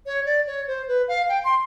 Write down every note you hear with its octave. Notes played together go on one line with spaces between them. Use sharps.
C#5
D5
C#5
C5
B4
F5
G5
C6